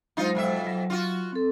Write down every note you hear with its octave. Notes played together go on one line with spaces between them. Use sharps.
F#3 G#3 D#4 F4 C5
F2 B2 E5
F#3
F4 F#4
C4 A4